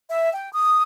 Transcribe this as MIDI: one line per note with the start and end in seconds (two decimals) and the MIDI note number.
0.10 0.32 76
0.33 0.51 79
0.54 0.81 87